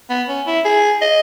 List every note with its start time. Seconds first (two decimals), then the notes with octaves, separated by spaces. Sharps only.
0.10 B3
0.28 C#4
0.47 E4
0.65 G#4
1.01 D#5